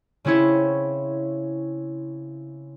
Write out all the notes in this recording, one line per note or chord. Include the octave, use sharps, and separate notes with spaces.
C#3 C4 C#4 E4 C#5